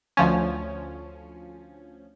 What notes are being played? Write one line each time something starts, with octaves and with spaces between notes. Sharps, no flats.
D2 F3 C#4